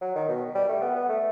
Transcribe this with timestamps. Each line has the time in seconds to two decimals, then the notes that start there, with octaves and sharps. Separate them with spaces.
0.02 F#3
0.15 D#3
0.28 B2
0.55 G3
0.69 A3
0.81 B3
0.96 B3
1.09 A3